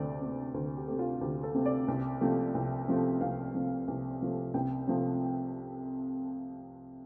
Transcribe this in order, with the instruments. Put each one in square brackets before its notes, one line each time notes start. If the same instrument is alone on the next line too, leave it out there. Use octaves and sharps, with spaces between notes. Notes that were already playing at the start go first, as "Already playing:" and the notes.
Already playing: [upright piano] D2 C3 A3 D5
C3 A3
D2
G4
C3 A3 G4
F4
D2 G4
A4
C3 A3
D5
C2
C3 F3 A3
C2
C3 F3 A3
C2 F5
C3 F3 A3
C2
C3 F3 A3
C2 G5
C3 F3 A3